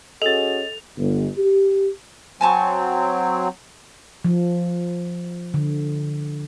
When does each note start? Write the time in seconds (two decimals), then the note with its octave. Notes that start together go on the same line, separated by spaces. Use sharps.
0.22 C#4 F#4 G#4 A4 D#5 A6 F7
0.97 G1
1.38 G4
2.41 F#3 C4 G#5 A5 C#6
4.25 F3
5.54 D3